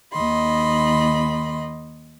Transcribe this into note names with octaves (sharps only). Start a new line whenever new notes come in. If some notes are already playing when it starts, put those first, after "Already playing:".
D#2 D#3 D#5 B5 C6